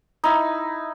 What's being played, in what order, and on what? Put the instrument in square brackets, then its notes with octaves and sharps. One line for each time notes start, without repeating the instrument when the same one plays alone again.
[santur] D#4 E4